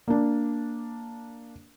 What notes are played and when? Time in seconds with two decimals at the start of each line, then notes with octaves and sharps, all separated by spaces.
0.08 A#3 D4